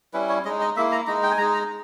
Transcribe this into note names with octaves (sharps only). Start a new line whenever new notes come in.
G3 C#4 E4 B4
C#5
G#3 D#4 D#5
D#5
A#3 E4 E5
A#5
G#3 D#4 A#5
G5
G#5
G#3 D#4 A#5
A#5